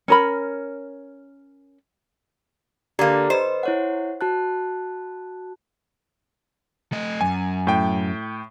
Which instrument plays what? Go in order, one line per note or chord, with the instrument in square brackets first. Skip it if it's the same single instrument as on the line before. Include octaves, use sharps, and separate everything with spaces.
[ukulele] C#4 A#4 B5
[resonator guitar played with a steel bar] D3 A#3 [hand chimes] G4 D5 A#5
[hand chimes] B4 D#5 [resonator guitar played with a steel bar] C5
[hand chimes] E4 C#5 F#5
F#4 A5 F#6
[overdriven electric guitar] A3 D#5
[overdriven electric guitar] F#2 [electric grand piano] G#5
[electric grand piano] A2 G5